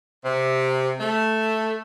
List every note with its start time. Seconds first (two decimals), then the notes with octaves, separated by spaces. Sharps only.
0.24 C3
1.00 A3